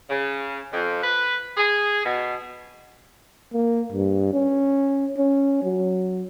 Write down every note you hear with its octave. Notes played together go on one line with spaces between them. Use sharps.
C#3
F2
B4
G#4
B2
A#3
G2
C#4
C#4
F#3